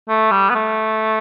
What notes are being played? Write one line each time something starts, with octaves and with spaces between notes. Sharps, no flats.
A3
G3
B3
A3